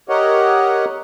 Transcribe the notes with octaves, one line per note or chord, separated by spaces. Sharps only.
G4 A#4 C#5 D#5 F#5